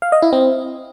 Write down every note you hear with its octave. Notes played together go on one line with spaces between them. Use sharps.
F5
D#5
E4
C4